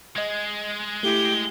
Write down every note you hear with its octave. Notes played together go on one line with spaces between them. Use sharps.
G#3 D#5 G#6
A3 E4 G4 G7